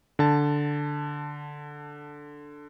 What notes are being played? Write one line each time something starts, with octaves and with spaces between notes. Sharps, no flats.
D3 A5